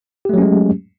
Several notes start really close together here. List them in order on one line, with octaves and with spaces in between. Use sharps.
G4 A3 F#3 C#4 G#3